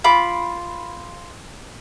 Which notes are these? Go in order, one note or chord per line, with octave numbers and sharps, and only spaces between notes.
F4 B5 D6